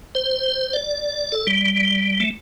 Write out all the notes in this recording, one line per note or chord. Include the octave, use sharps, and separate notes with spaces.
C5
D5
A4
G3
A3